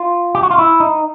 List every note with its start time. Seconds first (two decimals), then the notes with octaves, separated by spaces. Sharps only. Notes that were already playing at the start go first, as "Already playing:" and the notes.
Already playing: F4
0.35 G4
0.43 F#4
0.51 F4
0.58 E4
0.80 D#4